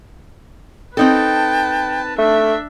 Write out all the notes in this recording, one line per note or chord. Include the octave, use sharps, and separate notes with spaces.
C4 D#4 A4 B4 G5 A5
A3 D4 E5